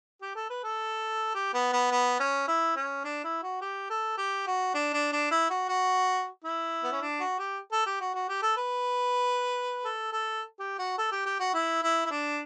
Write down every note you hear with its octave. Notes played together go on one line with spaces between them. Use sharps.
G4
A4
B4
A4
G4
B3
B3
B3
C#4
E4
C#4
D4
E4
F#4
G4
A4
G4
F#4
D4
D4
D4
E4
F#4
F#4
E4
B3
C#4
D4
F#4
G4
A4
G4
F#4
F#4
G4
A4
B4
A4
A4
G4
F#4
A4
G4
G4
F#4
E4
E4
E4
D4